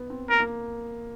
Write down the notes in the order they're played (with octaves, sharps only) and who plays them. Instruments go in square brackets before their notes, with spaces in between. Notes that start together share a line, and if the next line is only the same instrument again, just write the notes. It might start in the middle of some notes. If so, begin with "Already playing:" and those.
Already playing: [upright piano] B3
C4
[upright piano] A#3 [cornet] A#4
[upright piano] A#3